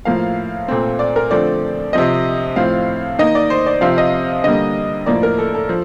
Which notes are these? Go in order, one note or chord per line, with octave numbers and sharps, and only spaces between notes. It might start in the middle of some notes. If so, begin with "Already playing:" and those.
A2 F3 A#3 F5
A#2 A3 C4
D5
A#4
D3 F3 A3 C4 D5
C3 F3 C4 D#5
A2 F3 C4 F5
D#3 A#3 D#5
D5
C5
D5
C3 F3 C4 F5
D#5
D3 G3 A#3 D#5
A2 F3 A#3 D5
A#4
A4
A4
F3